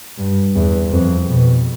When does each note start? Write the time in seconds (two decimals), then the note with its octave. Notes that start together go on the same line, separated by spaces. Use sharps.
0.18 G2
0.55 E2
0.92 F2
1.29 B2